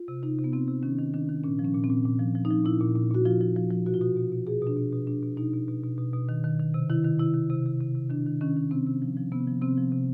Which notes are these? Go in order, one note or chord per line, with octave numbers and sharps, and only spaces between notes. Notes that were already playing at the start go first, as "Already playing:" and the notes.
Already playing: F4
C3
C3 D#4
C3
B3
C3 C4
C3
D#3 C#4
D#3
D#3 D4
D#3
A#2 C#4
F3
C#4
A#2
C4
A#2
A#2
F3
F3
D#4
F3
A#2 E4
A#2
A#2
A#2 F#4
F3 F4
F3
F3
F3
B2 F#4
F4
B2 F#4
B2
B2
B2 G#4
B2
D4
B2
B2
B2 D4
B2
B2 D#4
B2
B2
B2
B2
B2
D#3
D#3
D#3
C3
D#3 E4
D#3
C3 E4
D#3
C3
C3
C3
C3
D#3 D4
D#3
D#3 C#4
D#3
C3 C4
C3
F3
F3
C3 B3
F3
C3 C4
F3
C3